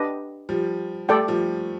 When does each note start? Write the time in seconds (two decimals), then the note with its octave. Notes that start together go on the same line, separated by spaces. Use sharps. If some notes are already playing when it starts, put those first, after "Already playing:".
Already playing: D4 G4 B4 D#5
0.49 F3 G3
1.08 G3 A3 A4 D5 G5
1.28 F3 G3